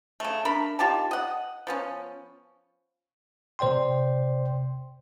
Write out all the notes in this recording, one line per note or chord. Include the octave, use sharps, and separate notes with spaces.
C#3 A3
D4 A#4 B5
D#3 F4 G4 A5
D#5 F#5
F3 B3 C#4
C3 C5 D5 G5 C6